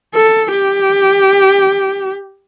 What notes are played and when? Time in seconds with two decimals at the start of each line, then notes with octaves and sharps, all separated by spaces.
0.14 A4
0.51 G4